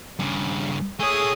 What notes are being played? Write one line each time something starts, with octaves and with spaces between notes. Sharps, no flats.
G2 C#3
A3 G#4 C#5 D#6